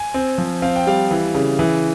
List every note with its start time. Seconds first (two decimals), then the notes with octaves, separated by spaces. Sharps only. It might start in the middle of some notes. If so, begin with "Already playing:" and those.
Already playing: G#5
0.14 C4
0.38 F3
0.62 C4 F5
0.76 G5
0.87 G3 F5
1.11 E3
1.34 C#3
1.59 E3